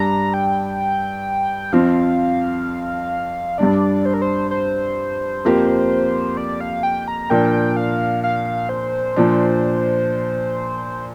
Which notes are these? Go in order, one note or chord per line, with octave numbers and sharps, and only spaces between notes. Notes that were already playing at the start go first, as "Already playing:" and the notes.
Already playing: G2 G3 D4 A#5
G5
F2 F3 C4 F5
G2 G3 D4 D5
C5
A#4
C5
C5
F2 F3 A#3 G4
D5
F5
G5
A#5
A#2 F3 D4 A#4 G5
F5
F5
C5
A#2 F3 D4